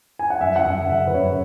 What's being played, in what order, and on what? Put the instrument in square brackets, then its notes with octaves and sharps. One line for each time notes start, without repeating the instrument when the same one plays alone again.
[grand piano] G#5
F#5
F#2 E5
F#5
F#2 E5
C#3 E5
B4
F#2 C#5